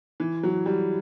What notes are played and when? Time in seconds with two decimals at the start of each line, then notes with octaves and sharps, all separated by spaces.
0.20 E3
0.43 F#3
0.66 G3